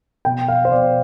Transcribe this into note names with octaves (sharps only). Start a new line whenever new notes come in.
B2 G5
F5
C5
B2 D5